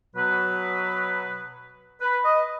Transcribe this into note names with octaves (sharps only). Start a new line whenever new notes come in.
B2 F#3 B4
B4
D#5